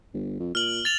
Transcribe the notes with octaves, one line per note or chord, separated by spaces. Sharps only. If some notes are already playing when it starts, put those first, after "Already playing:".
G1
F2
A#2 F6 F#7
A6 F7